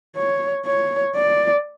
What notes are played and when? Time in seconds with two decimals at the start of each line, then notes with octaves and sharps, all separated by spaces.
0.16 C#5
0.66 C#5
1.16 D5